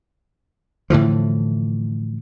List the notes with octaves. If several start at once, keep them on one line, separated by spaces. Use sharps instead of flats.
A2 D3 E3 F3